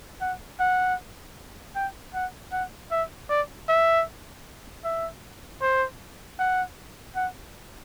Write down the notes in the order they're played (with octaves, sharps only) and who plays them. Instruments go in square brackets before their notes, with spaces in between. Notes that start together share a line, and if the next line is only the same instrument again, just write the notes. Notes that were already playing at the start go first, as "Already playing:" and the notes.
[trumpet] F#5
F#5
G5
F#5
F#5
E5
D5
E5
E5
C5
F#5
F#5